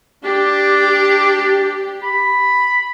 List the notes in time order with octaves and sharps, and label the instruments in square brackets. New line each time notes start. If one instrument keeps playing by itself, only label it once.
[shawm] D4 [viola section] G4
[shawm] B5